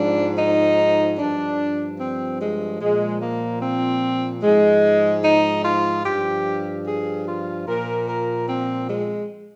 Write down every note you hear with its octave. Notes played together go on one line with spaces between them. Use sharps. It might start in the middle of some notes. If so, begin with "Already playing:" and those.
Already playing: G#2 F3 D4
D#4
G2 F3 D4
C4
G#3
A#2 F3 G#3
A#3
C4
G#2 F3 G#3
D#4
F4
G2 F3 G4
G#4
F4
A#2 F3 A#4
A#4
C4
G#3